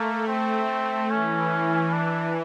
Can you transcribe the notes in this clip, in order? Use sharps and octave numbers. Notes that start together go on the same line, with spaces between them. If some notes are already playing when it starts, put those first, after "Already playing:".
Already playing: A3 A#3
C4
E3 C#4
D4